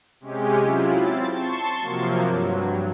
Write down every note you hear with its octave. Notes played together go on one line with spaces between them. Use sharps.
C3 G#3 C#4 G4
F#3 E4 F4
C4 A6
A5 C6 C#6
C3 F3 F#3 A#3
G2 F#3